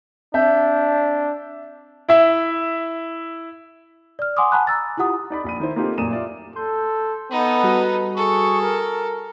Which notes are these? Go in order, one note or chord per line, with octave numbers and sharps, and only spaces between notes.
C4 D4 E5 A5 G6
E4 E5
D5 F6
F#5 G#5 C6 D6 D#6
F#5 G#5 A5 B5 F#6
A#5 E6 A6
E4 F4 G4 F#5 D#6
D#4 D5 B5
A#1 B5 D#7
D#3 E4 C5
A#3 C4 D#4 F4 G4 A4
F#2 A#2 A#3 D#6 D#7 E7
F4 D5 E5
A4 C6 G6
B3 D#4 A4 B4
G3 F#4
G#4 A4 C#6
A#4